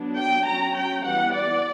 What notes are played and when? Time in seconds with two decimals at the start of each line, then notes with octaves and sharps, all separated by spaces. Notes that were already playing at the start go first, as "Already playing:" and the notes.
Already playing: F#3 B3 D4
0.18 G5
0.47 F#3 C#4 A#5
0.76 G5
1.04 E3 G3 B3 F#5
1.32 D5